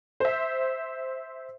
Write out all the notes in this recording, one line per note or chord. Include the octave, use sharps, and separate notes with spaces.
C5 E5